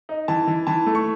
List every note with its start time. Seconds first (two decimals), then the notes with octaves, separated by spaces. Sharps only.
0.09 D#4
0.28 E3 A5
0.47 E3
0.67 E3 A5
0.86 A3
0.95 C#6